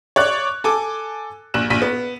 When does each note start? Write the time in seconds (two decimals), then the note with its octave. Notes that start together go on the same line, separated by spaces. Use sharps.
0.16 C#5 D5 F#6
0.64 A4 G#5 D6
1.54 A#1 F#6 E7
1.70 A#1 B6 D#7
1.82 B3